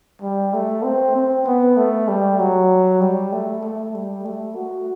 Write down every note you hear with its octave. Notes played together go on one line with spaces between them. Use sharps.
G3
A3
C4
C4
B3
A3
G3
F#3
G3
A3
A3
G3
A3
F#4